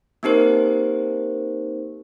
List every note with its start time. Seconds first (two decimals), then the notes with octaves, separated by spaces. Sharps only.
0.23 A#3 C4 D#4 G4 A#4 C5